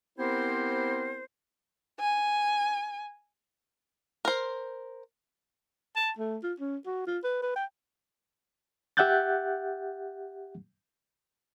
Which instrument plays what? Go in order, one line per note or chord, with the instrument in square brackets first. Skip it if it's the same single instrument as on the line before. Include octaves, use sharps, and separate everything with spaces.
[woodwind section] B3 C4 E4 G4 A#4 C5
[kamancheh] G#5
[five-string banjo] A#4 C5
[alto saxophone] A5
A3
F4
C#4
F#4
F4
B4
B4
G5
[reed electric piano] G4 E5 F#5 F#6 G6 A6